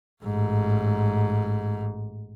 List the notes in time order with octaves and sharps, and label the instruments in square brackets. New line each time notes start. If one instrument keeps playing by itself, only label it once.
[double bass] A1 G#2